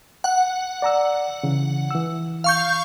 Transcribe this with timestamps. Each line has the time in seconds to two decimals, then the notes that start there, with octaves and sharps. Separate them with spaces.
0.24 F#5
0.82 D5 A#5 E6
1.43 C#3 E3
1.91 E3 E6
2.44 F5 C#6 G6